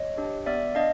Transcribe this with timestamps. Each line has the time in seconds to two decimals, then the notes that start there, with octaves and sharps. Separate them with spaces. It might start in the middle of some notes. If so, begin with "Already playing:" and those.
Already playing: C#5 D#5
0.17 D4 G4
0.46 B3 D5 E5
0.75 D4 D#5 F5